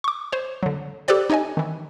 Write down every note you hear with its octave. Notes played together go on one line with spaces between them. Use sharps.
C#6 D6
C5 C#5
D3 F#3
G4 A4 B4 C5 D5 G5
D#4 G4 C#5 D#5 G#5
D#3 E3